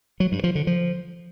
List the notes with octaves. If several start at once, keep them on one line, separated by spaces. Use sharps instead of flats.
F#3
G2
F3
D3
F3